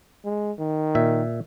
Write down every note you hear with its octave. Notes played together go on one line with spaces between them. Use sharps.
G#3
D#3
A#2 E5